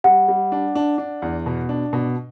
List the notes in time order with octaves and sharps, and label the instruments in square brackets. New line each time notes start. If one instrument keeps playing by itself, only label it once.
[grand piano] G3 [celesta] F#5
[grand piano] G3
D4
D4
D4
E2
B2
D4
B2